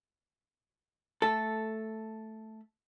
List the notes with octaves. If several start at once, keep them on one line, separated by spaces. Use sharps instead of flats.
A3 A4